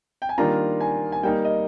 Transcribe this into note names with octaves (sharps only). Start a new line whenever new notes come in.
G5
G#5
D#3 G3 A#3 D4 F4 A#5
G#5
G#5
G3 A#3 D#4 G5
D#5